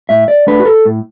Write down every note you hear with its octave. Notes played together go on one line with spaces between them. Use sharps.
A2 E5
D5
A3 D4 B4
F#4
A4
A2